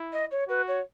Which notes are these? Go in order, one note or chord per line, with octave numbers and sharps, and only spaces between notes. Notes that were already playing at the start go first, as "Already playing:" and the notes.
Already playing: E4
D#5
C#5
F#4 B4
C#5